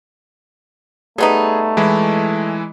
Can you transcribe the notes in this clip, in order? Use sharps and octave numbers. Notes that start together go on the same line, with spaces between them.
G3 A3 B3 D#4 G#4
E3 G#3 E4